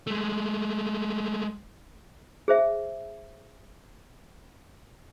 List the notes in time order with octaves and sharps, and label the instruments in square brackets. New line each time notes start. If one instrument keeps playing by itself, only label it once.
[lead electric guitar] G#3 A3
[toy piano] G#4 C5 E5